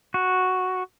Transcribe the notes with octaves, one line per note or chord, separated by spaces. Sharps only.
F#4